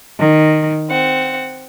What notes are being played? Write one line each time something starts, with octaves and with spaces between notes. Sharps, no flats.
D#3
C4 F#5